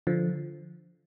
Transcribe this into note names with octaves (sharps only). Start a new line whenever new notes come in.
D3 F3